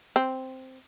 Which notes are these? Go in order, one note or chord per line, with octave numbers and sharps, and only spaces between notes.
C4